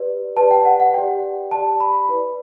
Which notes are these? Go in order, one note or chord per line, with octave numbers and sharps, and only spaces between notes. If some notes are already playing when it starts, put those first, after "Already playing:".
Already playing: G4 B4 D5
G4 B4 D5 A5
G5
F#5
F#5
G4 D5 G5
G4 D5 A5
B5
E4 B4 D5